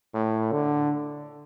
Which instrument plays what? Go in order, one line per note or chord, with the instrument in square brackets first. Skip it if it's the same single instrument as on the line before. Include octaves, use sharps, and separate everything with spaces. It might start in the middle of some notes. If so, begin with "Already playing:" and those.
[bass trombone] A2
D3